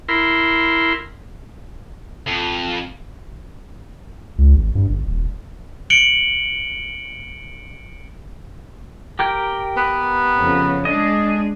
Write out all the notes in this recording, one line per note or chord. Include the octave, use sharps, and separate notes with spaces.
E4 A#4 C6
F2
C#2
G#1
G2
G1
D#1
C#7 D7 F#7 G7
G4 A#4 G5
B3
F2 C#3
G#3 D4 G#4 D#5